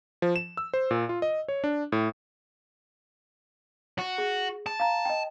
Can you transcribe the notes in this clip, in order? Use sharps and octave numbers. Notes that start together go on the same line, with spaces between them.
F3
E7
E6
C5
A#2
F4
D#5
C#5
D4
A2
F#4
G#4
A5
F5 A#5
D#5 G5